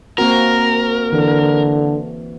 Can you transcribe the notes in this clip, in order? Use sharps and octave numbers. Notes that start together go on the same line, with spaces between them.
A#3 C4 F#4 A#4
D3 E3